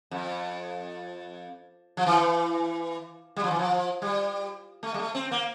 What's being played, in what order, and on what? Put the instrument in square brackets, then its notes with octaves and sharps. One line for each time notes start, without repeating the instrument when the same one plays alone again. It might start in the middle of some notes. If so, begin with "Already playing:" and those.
[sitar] F2
F3
E3
G3
F3
E3
F3
G3
A3
G3
A3
C4
A#3